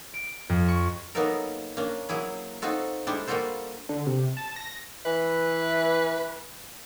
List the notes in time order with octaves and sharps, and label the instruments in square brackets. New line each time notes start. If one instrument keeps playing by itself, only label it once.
[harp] D7
F2
C#6
[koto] F#3 A#3 B3 D#4 A4 A#4
A#3 C#4 D4
F#3 A#3 E4 G#4
C4 D#4 F4 F#4 A4
G3 G#3 D4 E4 G4 A4
G3 A#3 F4 F#4 A4 C5
[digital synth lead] D3
C3
A5
A#6
[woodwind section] E3 [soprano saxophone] B4